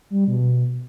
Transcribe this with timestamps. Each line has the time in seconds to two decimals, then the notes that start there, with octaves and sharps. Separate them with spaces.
0.10 G3
0.28 B2